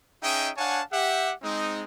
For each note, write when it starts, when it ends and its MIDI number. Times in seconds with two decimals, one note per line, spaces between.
0.23 0.51 61
0.23 0.51 63
0.23 0.51 68
0.23 0.51 75
0.23 0.51 76
0.23 0.51 79
0.57 0.82 62
0.57 0.82 73
0.57 0.82 77
0.57 0.82 78
0.57 0.82 80
0.57 0.82 81
0.92 1.33 67
0.92 1.33 76
0.92 1.33 78
1.43 1.84 56
1.43 1.84 60
1.43 1.84 63